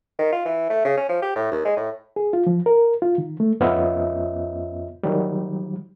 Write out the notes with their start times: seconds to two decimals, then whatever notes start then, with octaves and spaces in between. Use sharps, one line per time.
0.19 D#3
0.33 F4
0.45 E3
0.70 A3
0.85 C#3
0.97 C#4
1.09 F3
1.22 G4
1.36 A2
1.51 D#2
1.65 G#3
1.76 A2
2.16 G#4
2.33 F4
2.47 F3
2.66 A#4
3.02 F4
3.18 D#3
3.40 A3
3.60 F2 B3 C#4 F4 D#5 E5
5.03 D#3 F#3 G3